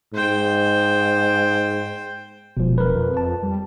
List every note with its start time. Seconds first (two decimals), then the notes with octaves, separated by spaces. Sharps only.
0.14 G#2 C5 G5
2.57 E1 B2 F3
2.78 A#4 B4
2.96 F2
3.17 A5
3.43 G3